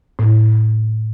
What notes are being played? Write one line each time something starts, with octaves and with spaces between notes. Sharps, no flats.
A2